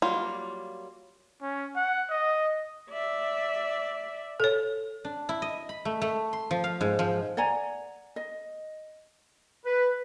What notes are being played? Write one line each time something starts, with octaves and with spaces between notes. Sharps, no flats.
F#3 G3 A#3 F4
C#4
F#5
D#5
D5 E5
A4 C#5
D4
E4
D#5
B5
A3
A3
C6
F3
F5
G#2
F3
D5 F#5 G#5 A#5
D#5
B4